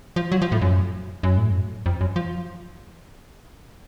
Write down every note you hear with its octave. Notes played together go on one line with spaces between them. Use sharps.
F3
F#3
F3
A2
F#2
F#2
A2
F#2
F2
F#2
F3